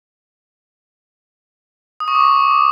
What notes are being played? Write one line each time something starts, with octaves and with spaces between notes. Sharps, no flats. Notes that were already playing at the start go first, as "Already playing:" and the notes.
D#6
C#6
D6